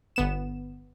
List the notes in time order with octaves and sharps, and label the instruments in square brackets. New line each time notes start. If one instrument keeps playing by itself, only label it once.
[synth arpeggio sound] G1 B3 E7